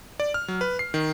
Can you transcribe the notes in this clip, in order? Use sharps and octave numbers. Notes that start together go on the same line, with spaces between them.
D5
F6
F#3
B4
C7
D#3